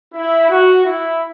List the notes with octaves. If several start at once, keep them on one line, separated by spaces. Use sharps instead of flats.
E4
F#4
E4